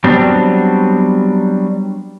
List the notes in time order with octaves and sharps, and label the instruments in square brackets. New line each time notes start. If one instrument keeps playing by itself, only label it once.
[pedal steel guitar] F#3 G3 B3 C4 D4